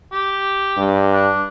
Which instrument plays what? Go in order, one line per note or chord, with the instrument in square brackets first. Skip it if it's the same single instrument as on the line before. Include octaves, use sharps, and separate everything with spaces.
[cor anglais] G4
[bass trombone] G2
[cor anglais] D4